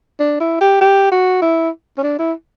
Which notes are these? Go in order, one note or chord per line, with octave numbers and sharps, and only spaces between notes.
D4
E4
G4
G4
F#4
E4
C#4
D4
E4